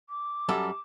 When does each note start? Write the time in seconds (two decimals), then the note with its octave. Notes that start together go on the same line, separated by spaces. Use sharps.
0.10 D6
0.49 F#2 G3 A4